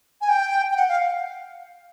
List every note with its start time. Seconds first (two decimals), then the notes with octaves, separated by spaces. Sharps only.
0.21 G#5
0.29 G5
0.72 G5
0.77 F#5
0.89 F5